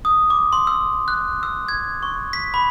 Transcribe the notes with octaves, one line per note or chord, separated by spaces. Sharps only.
D#6
D6
C6
E6
F#6
E6
G#6
C#6
B6
B5